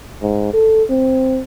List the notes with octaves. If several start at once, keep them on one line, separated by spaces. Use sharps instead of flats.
G#2
A4
C4